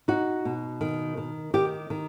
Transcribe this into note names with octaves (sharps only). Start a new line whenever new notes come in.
D#4 F#4
B2
D#3
D#3
D#3 G4
D#3